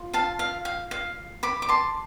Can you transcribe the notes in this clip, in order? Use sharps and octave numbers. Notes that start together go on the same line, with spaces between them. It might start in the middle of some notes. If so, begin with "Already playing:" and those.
Already playing: F4
F5 A5
F5
F5
F5
B5 D6
D6
A5 C6